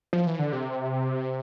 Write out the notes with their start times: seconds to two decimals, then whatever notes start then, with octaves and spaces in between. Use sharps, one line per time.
0.13 F3
0.26 E3
0.39 D3
0.53 C3